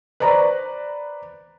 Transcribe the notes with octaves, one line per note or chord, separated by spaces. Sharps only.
B4 C5 D5 A#5 C#6 A#6